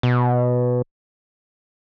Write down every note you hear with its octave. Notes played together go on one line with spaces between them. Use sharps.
B2